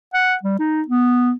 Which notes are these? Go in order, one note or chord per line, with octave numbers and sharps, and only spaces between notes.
F#5
G3
D#4
B3